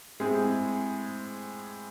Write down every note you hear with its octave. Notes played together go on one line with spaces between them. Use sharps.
A2 G#3 C4 G#4